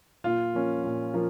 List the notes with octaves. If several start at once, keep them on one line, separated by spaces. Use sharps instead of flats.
A#2 F4
F3 A#3 C#4
A#2
F3 A#3